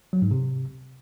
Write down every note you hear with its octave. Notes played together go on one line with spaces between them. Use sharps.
F#3
G#2
C3